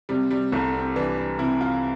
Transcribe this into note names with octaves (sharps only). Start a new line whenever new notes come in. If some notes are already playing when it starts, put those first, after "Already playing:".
C3 G3
G3
C2 A3
C4
E3 D4
D4
C3 E4
F4